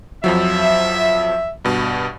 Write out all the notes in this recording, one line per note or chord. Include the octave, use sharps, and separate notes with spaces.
F2 F3 F#3 E5
G2 B2